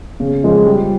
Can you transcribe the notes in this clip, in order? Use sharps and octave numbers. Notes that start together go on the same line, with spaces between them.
C#3
F3 G#3
G3